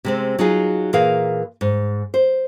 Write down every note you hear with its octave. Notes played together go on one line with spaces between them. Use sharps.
C3 G#3 C4
F#3 D#4 F4 G#4
A#2 E3 G#4 A#4 F5
G#2
C5